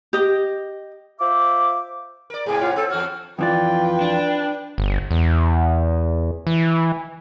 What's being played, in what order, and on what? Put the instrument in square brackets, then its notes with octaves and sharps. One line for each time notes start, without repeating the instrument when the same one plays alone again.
[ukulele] G4 D#5
[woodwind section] F4 C5 E5 D6
[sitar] A#4 D5
[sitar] G#2 C3 A#3 [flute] G#4
[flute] F4 [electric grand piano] C#5 F#5
[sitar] C4 [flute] A4
[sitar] E2 F#4 [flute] F6
[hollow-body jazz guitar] F2 E3 D5 [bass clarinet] F4 [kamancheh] B4 G5
[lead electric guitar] D4
[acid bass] G1
E2
E3